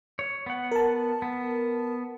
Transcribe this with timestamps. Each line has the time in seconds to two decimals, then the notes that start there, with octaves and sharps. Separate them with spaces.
0.19 C#5
0.46 B3 F#5
0.72 A#4 A5
1.22 B3